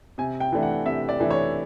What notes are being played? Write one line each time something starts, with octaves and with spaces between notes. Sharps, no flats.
C3 G#5
G5
E3 A3 D4
F#5
C3 E5
D5
E3 A3 D4
C#5